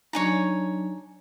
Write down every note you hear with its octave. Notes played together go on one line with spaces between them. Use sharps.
F#3 D4 D#4 C#5 G#5 A#5